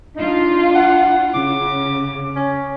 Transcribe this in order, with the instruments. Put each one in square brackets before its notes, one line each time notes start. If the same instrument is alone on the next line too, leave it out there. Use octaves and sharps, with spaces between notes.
[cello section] D4 F4 [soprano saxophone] D#4
[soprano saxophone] F#5
[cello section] C#3 [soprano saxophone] D6
[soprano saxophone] C#4